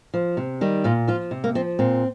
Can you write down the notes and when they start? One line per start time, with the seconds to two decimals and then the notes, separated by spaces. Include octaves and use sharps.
0.14 F3
0.37 C3
0.61 D#3 G3
0.84 A#2 F4
1.08 F3 F4
1.31 C3
1.44 A#3
1.55 F3 C4
1.79 A#2 C4